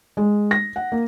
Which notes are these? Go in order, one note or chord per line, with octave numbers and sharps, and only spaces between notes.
G#3
A#6
F#5
A#3